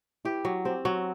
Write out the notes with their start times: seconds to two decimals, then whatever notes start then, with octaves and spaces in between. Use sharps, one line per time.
0.25 E4 G4
0.45 F#3 F#4
0.65 C4 G4
0.85 F#3 F#4